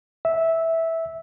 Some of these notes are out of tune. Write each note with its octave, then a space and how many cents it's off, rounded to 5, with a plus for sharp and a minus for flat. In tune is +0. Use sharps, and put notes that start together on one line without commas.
E5 -10